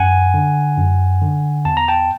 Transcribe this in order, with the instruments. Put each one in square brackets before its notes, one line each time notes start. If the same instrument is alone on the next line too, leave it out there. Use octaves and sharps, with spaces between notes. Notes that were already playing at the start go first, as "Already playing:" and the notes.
Already playing: [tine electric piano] F#2 F#5 G#5
D3
F#2
D3
E2 A5
A#5
G5 A5